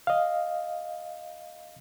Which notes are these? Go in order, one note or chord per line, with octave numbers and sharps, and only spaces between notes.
D#5 F5